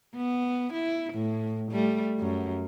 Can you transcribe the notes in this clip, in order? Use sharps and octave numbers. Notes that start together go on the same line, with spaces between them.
B3
E4
A2
G3 A3
F#2